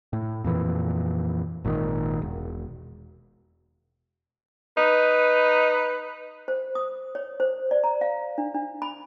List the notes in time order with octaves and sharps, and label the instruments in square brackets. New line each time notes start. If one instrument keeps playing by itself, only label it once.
[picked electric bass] A2
F2 A#2 E3
G#1 A#2 D3 D#3
E1
[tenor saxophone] D#4 [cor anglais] B4
[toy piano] C5
D#6
C#5
C5
D5
A#5
F5
D4
D4
B5